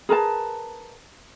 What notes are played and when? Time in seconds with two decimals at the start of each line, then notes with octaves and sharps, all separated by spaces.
0.09 G#4 A#4 B4 A5